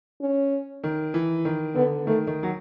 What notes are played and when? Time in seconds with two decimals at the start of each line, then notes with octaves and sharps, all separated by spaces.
0.21 C#4
0.84 D#3
1.14 E3
1.45 D#3
1.75 D3 B3
2.07 D#3 A3
2.27 D#3
2.43 F#3